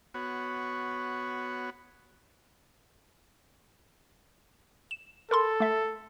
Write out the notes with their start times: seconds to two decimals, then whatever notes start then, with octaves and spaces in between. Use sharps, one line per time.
0.14 B3 F#4 C#5
4.91 E7
5.31 A4 A#4 B5 C6
5.60 A3 E5